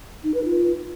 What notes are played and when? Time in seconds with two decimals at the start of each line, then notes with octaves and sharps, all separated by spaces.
0.24 D#4
0.34 B4
0.45 F4